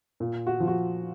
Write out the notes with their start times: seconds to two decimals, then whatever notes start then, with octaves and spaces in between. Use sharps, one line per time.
0.20 A#2
0.47 F#4
0.60 F3
0.68 F#4